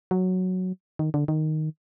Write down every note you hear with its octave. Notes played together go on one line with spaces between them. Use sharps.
F#3
D#3
D3
D#3